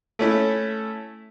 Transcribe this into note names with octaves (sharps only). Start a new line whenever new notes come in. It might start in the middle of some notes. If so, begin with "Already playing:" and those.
A3 C#4 E4